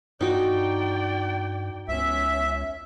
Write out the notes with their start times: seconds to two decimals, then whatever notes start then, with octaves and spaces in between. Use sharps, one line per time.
0.21 G2 D#4 F#4 D5 G5
1.88 C#2 B3 C#4 E5